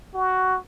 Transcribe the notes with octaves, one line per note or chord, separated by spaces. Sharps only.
F#4